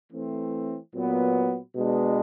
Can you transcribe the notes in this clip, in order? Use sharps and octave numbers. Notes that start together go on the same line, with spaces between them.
E3 A3 C4
A#2 F#3 B3
B2 G#3 B3 D4